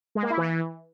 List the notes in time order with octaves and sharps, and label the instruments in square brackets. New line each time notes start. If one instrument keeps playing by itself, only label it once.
[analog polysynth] G#3
A#3
E4
E3